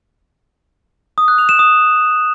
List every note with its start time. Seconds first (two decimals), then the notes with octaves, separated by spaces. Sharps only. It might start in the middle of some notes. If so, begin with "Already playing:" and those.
1.18 D#6
1.28 F#6
1.38 F7
1.49 E7
1.59 D#6